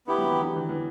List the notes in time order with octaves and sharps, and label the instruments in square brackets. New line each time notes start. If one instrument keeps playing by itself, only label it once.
[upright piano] D3 [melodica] B3 E4 G4
[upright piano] F#3
E3
D3
E3
E3